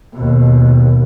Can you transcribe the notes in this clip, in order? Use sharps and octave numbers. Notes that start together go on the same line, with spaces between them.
D#2 B2